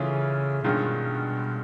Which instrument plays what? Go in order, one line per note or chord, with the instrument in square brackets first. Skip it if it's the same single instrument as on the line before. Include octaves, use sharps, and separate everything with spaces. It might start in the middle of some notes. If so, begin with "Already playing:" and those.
Already playing: [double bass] C#3 [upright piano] E3 A3 C#4 F4 G#4
[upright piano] G2 D#3 G#3 C#4 F4 [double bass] B2